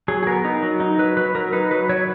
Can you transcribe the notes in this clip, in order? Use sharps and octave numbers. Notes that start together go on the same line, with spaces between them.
F#3 G#4
G#4
B3 A#4
D#4
F#3
D#4
F#3 B4
F#3 B4
F#3 A#4
D#4 B4
F#3 B4
F#3 C#5